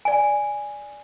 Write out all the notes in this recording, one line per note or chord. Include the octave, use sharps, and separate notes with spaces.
D5 G#5